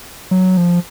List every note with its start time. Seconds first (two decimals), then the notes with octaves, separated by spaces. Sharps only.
0.31 F#3
0.57 F3